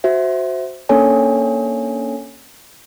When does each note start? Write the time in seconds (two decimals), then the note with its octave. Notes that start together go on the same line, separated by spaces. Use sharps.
0.04 F#4 C5 E5
0.89 A#3 C#4 D4 A4 C#5 G#5